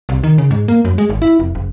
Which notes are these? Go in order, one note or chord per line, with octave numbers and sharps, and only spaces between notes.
C2
D#3
C#3
G#2
A#3
F#2
G#3
G#1
E4
F1
F#1